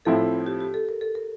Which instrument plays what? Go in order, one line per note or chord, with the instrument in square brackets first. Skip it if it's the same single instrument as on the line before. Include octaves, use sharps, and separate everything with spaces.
[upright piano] A2 F3 C4 E4 [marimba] A4
[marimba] G4
G4
A4
A#4
A4
A#4